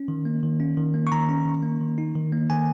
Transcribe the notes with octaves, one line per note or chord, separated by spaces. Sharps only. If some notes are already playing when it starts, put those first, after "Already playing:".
Already playing: C#4
D#3
A#3
D#3
C#4
D#3
A#3
C#6
D#3 A#5
C#4
D#3
A#3
D#3
D#4
D#3
A#3
D#3 G#5